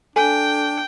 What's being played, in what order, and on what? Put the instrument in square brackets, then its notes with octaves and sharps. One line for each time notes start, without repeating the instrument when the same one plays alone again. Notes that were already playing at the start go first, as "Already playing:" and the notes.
[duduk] D4 [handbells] A4 [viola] G5 [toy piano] G#5